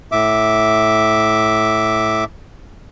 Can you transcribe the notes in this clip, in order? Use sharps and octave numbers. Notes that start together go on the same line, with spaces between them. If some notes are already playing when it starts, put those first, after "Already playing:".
A2 E5 D6